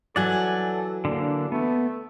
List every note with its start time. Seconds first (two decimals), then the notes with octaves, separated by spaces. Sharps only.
0.16 E3 F#3 A4 D5 F#5 G#5
1.05 D3 A#3 D4
1.52 A3 B3